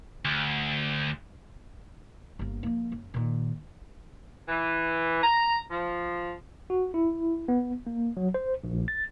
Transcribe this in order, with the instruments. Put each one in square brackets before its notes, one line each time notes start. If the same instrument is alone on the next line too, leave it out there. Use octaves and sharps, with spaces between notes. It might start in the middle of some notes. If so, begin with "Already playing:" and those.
[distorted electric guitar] D2
[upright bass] G1 A#3
F3 A#3
F#2
A#2 D#3
[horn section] E3
A#5
F3
[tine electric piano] F#4
E4
B3
A#3
F#3
C5
A#1
A6